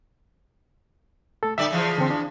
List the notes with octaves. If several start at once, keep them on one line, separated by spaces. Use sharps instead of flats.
A3 A4
D3 G3 D5 E5
C#3 E3 F3
D3 C4
D4